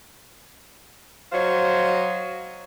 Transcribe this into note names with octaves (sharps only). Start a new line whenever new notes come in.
F#3 C5 C#5 D#5 F5